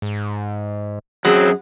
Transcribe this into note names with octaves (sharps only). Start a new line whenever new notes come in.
G#2
F#2 F#3 C4 G#4